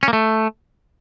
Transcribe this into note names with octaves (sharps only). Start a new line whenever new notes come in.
C#4
A#3
A3